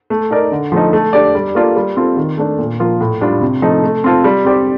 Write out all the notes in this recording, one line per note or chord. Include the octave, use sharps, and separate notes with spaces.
A3
D#4 A#4 D5
D3
F3 A3 D#4
A3
D4 G4 D5
G3
A#3 F4 A4 D5
G3
C4 F4 A4
D#3
A3 D4
A#2
F3 A#3 F4 A#4
A2
G3 D4 F4
C3
F3 A3 D#4
A3
C4 F4 A4
G3
C4 G4 D5